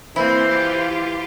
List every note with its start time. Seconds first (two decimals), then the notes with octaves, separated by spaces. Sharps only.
0.16 E3 A#3 C4 E4 C5
0.48 F4 G4